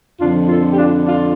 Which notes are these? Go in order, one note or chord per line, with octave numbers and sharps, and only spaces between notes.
F2 D3 F3 D4 F4
F4 A4
G4
D4 F4
D4 F4